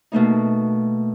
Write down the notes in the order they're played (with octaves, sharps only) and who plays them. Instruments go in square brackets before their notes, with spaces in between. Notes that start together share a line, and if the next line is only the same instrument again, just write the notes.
[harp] B2 A3 A#3 D#4